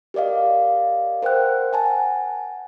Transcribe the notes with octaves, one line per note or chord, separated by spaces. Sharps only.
G4 A#4 D5 D#5 F5
A#4 C5 F#5 G5 F#6
F#5 G#5 A5